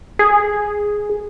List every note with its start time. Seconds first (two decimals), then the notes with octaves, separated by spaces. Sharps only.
0.19 G#4